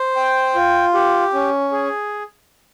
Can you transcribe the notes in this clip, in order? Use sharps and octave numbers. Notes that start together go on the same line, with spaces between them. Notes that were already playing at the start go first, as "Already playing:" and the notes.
Already playing: C5
G5
F4
G4
C#4
G#4